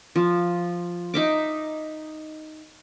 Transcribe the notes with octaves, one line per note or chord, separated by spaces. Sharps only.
F3
D#4 E5 D6